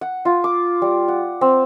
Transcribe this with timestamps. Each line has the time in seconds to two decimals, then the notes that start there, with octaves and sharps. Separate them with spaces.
0.01 F#5
0.25 F4
0.44 D6
0.82 G3
1.08 F#5
1.41 C4